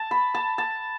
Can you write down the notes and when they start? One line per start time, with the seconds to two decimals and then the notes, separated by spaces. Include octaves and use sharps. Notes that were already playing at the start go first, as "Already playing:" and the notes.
Already playing: A5
0.11 B5
0.35 A5
0.58 A5